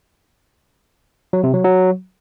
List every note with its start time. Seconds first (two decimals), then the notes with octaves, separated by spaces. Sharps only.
1.33 F#3
1.44 C3
1.54 F#3
1.64 F#3